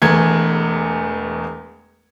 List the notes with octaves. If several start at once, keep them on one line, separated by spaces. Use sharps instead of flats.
E1 E2 A3 G#6